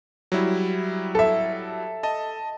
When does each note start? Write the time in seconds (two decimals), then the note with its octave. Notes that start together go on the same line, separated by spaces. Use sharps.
0.32 F#3 G3 E4
1.15 A4 E5
2.03 D#5 A5